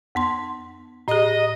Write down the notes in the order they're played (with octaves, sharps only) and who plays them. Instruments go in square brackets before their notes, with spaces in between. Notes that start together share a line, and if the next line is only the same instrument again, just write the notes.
[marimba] F2 B3 C6
[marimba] A2 G#4 [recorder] D#5